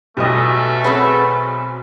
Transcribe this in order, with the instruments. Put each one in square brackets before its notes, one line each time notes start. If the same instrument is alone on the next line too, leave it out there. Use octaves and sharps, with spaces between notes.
[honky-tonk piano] B1 B2 [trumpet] A3 [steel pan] G4 D#5
[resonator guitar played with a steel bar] C4 F#4 B4 [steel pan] G#4 C#5